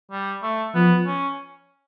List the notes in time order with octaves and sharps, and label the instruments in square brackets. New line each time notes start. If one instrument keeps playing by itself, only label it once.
[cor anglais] G3
A3
[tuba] F3 [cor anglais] B3
[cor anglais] C#4